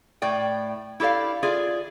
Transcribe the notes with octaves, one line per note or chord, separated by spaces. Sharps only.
A2 D5 G5
E4 G4 A4 D5 F5
F4 G#4 D5 E5